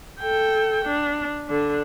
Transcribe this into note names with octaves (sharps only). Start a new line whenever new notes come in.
A4 G5
D4
D3 D4